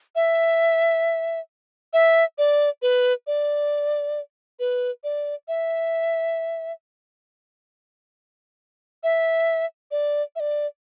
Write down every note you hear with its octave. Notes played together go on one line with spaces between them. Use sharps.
E5
E5
D5
B4
D5
B4
D5
E5
E5
D5
E5
D5